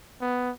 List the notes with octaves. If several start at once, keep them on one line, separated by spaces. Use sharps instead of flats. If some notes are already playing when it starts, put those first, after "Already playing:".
B3